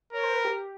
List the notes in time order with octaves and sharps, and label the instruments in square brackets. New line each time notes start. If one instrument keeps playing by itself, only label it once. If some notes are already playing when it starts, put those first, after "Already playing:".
[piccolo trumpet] A#4 [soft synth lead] C#5
[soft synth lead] C5
B4
G4